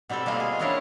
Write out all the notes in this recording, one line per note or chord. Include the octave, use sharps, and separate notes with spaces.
B2 G3 C4 G4 A4
G3 G#3 A#3 F4
G#4
G3 C#4 D4 E4 A#4 C#5